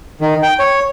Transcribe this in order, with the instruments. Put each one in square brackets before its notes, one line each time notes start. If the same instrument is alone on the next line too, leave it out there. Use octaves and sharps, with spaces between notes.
[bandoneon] D#3
G5
C#5